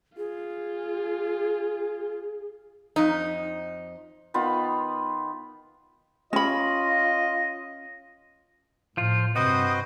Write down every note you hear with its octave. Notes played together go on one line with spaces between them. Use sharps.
F4 G#4
F2 D#4
D#3 B3 F4 B5
C#4 F4 D#5 B5
A2 F3 F4
G2 C3 C4 F#4 B4 C5 D#5 D#6